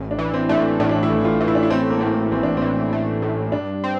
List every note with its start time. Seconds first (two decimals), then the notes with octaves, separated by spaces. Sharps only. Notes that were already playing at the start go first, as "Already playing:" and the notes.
Already playing: A1
0.11 D4
0.18 E3
0.34 C4
0.49 A3 D4
0.57 C4
0.80 A2 D4
0.91 D4
1.03 E4
1.10 A1
1.25 F4
1.40 E3
1.48 E4
1.55 D4
1.63 E4
1.70 A3 C4
1.90 A#3
2.01 A2 C4
2.32 A1 C4
2.43 D4
2.57 E3 C4
2.93 A3
3.22 A2
3.52 G2 D4
3.84 C4